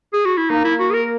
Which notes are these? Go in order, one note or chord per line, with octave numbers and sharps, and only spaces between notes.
G#4
F#4
E4
A#3 D#4
E4
F#4
G#4
A#4